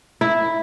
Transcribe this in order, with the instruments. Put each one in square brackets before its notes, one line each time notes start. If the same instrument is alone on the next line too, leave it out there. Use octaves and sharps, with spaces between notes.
[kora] E4